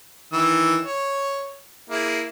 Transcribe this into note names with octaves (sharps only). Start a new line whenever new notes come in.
D#3 E3 E6
C#5
A#3 E4 G#4